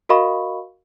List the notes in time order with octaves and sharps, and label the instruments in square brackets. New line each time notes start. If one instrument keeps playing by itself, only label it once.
[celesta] F#4 A#4 D#5 F5 B5 C#6